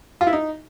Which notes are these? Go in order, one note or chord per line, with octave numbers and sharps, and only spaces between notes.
F4
E4
D#4